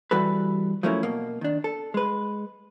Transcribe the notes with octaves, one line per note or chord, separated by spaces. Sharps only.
E3 G3 F#4 A4 B4
F3 F#3 A3 A#3 C#4 E4
B2 A#3
D#3 D4
A4
G#3 B4